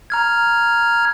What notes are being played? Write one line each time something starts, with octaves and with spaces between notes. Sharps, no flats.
A#5 F6 G#6